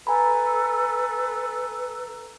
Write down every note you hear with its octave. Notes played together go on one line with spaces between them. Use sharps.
A4 B4 G#5 A#5 B5